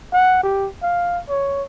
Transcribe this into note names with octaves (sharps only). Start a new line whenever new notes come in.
F#5
G4
F5
C#5